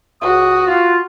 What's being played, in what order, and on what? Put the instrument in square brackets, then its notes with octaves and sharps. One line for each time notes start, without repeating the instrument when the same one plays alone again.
[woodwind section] C#2 D#6 [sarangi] F#4
[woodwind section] F4